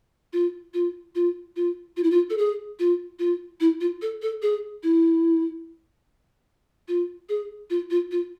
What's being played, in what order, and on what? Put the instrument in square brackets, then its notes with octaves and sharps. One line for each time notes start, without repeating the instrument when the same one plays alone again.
[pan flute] F4
F4
F4
F4
F4
E4
F4
A4
G#4
F4
F4
E4
F4
A4
A4
G#4
E4
F4
G#4
F4
F4
F4